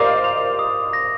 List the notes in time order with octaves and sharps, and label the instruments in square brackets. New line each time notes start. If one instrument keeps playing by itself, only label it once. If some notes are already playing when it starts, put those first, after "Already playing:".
Already playing: [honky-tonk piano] A#4 C5 D5 D#5 F5 [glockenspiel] D6
[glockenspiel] F7
D#6
A#6